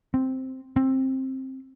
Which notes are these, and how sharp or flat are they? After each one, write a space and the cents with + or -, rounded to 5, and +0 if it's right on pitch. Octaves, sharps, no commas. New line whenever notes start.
C4 +0
C4 +15